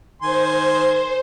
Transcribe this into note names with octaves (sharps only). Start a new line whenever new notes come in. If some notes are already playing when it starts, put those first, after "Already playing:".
D#3 C5 G#5 C6